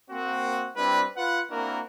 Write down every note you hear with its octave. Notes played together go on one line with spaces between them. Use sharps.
A#3 C4 F#4
G3 C4 D4 E4 B4
F4 B4 F#5
A#3 C4 D4 E4 F#4 A#4